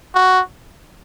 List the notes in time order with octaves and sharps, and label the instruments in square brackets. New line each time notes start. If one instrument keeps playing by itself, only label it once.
[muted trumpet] F#4